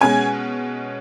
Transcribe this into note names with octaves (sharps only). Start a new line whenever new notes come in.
B2 G#3 C#4 G#5